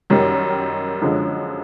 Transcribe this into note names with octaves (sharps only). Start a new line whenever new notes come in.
F#2 D#3 G3
F#2 D3 F3 G#3